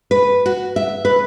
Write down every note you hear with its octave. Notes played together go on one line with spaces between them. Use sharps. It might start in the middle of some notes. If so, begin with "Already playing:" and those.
B4
F#4
E5
B4